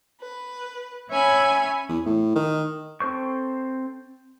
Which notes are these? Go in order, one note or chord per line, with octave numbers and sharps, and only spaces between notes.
B4
C#4 C#5 E5 G#5 B5
E2
A2
D#3
C4 A4 C5 C#6